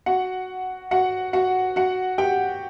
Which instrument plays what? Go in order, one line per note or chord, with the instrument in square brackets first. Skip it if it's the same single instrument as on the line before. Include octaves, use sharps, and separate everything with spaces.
[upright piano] F#4 F#5
F#4 F#5
F#4 F#5
F#4 F#5
G4 G5